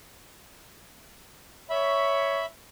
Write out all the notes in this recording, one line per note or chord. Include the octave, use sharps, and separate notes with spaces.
C#5 E5 B5